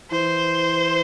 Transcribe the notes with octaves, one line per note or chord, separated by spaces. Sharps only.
E3 C5